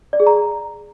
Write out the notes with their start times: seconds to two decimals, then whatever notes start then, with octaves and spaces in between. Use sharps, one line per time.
0.13 D5
0.20 G#4
0.27 A#5